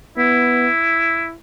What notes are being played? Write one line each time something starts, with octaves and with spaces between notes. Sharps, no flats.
B3 E4